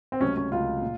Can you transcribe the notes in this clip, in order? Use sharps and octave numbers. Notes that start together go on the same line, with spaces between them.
C4
C#2 C3 F#3 A3 C#4
C#4
C#2 C3 F#3 A3 F4
A#2